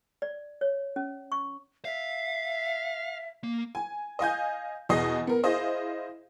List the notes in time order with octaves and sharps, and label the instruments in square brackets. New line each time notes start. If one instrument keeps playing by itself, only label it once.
[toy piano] D5
C#5
C#4
C#6
[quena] E5 [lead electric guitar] F5
[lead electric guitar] A#3
[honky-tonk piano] G#5
D#5 F5 G#5 G6
E2 B2 G#4 D#5 C7
B3 A#4
E4 G#4 C5 D#5 F5